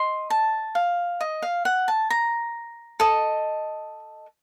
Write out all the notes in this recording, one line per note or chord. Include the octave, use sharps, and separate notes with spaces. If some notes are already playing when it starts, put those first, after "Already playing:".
Already playing: D#5 C6
A5
F5
D#5
F5
F#5
A5
A#5
A4 D#5